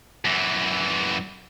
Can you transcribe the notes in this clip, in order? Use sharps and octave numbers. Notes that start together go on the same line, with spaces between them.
F#2 E3